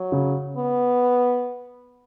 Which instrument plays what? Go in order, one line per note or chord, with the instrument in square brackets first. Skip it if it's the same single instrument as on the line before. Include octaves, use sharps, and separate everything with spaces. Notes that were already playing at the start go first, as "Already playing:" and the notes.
Already playing: [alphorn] F#3
[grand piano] C#3
[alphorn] B3